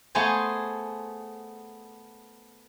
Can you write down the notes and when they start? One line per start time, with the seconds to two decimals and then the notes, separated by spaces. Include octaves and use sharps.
0.15 A3 B3 G#4 C5 G#5